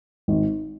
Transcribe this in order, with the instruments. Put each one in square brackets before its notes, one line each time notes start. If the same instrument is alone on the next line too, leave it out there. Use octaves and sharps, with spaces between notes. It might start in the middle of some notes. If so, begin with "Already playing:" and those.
[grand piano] G#1